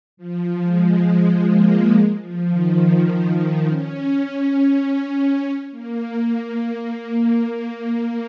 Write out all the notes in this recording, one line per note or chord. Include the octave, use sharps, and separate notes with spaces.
F3
G#3
G#3
A#3
G#3
F3
D#3
F3
F3
D#3
C#4
C#4
A#3